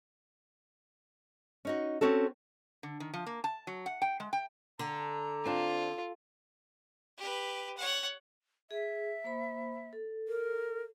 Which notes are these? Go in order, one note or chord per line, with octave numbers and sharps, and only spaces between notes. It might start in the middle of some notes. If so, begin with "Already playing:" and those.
C#4 D#4 F#4
C4 C#4 F#4 A4
D3
D#3
F3
A#3
A5
F#3
F#5
G5
G#3
G5
D3 A#5
C4 D4 F4
G4 B4
C#5 F#5
G#4 E5
A#3 C5 B5
A4
A#4